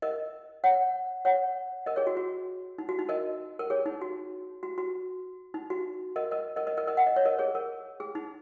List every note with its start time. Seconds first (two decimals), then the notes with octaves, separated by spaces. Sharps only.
0.02 A#4 D#5
0.64 C#5 F#5
1.25 C#5 F#5
1.86 A#4 D#5
1.96 G#4 C#5
2.07 F#4
2.17 F#4
2.78 D#4
2.89 F#4
2.99 D#4
3.09 A#4 D#5
3.59 A#4
3.70 G#4 C#5
3.86 D#4
4.02 F#4
4.63 F#4
4.78 F#4
5.54 D#4
5.70 F#4
6.16 A#4 D#5
6.31 A#4 D#5
6.56 A#4 D#5
6.67 A#4 D#5
6.77 A#4 D#5
6.87 A#4 D#5
6.97 F#5
7.07 D#5
7.16 C#5
7.25 A#4 D#5
7.39 G#4 C#5
7.55 A#4
8.00 G#4
8.15 D#4